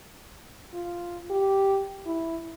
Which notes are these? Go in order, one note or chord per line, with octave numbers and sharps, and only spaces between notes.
F4
G4
E4